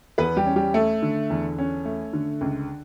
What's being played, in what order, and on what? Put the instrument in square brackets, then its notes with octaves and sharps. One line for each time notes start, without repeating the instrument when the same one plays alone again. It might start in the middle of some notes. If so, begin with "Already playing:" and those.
[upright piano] E2 B3 B4
G3 G4
C#4
G3 G4
A3 A4
D3
E2
C#4
A3
D3
C#2